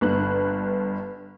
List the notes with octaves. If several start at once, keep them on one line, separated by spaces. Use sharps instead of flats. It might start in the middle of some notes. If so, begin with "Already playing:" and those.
G1 G2 F#6